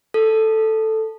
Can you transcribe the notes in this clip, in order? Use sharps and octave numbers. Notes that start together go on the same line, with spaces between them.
A4